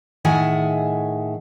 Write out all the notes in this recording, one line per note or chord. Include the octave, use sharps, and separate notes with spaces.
A2 D#3 G#4 E5 F#5 G#5